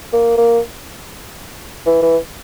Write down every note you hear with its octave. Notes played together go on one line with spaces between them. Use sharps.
A#3
A#3
E3
E3